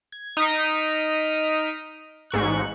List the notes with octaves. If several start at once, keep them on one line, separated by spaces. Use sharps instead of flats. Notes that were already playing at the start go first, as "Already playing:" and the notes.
G#6
D#4 D#6 F6 B6 D7
A1 G#2 C#6 F#6